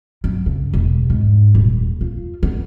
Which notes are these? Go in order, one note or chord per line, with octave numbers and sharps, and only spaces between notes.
F#2
C#3
E1
G#2
D#1
F4
B3